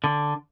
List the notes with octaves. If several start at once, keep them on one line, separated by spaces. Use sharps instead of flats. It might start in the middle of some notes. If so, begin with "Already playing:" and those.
D3